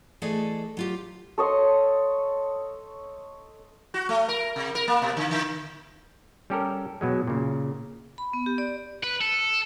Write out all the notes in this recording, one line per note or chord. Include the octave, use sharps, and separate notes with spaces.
E3 A3 G#4 A4 D5 D#5
F#3 F4 G4
A4 C#5 D#5 C6
F#4
A3
A#4
C3
A#4
A#3
B2
D3
D3
G3 C#4 G4 A4 A#4
B2 F#3 G#3
A#2 C#3
B5
B3
G4
D5
B4
A4